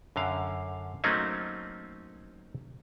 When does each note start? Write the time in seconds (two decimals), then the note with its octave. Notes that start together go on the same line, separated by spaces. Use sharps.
0.16 F#2 D3 F5
1.04 F#3 A3 A#3 C4 C#4 D#4